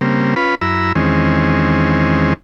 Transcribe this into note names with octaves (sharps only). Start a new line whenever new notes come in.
C#3 G3 A#3 C4
C#4 F4 B4 B5
F#2 E4 A#5 B5 E6
E2 D#3 G#3 C4 C#4